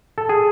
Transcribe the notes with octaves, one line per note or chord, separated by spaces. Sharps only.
A4
G#4